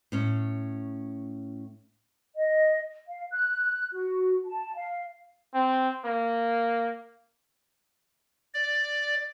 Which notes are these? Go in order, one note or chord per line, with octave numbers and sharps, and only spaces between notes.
A2 C#4
D#5
F5
F#6
F#4
A5
F5
C4
A#3
D5